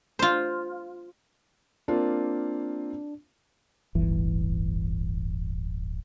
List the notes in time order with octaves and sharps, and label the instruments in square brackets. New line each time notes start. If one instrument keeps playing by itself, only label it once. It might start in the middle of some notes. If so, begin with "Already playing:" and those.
[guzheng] F4 C5
[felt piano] A#3 C4 F4 [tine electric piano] D4
[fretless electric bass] D1 G1 E3